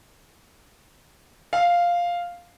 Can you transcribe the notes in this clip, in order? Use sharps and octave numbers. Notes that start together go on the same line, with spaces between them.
F5